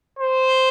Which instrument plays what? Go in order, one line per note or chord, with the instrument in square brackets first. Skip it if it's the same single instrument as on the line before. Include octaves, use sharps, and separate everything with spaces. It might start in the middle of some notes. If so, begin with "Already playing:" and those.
[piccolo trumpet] C5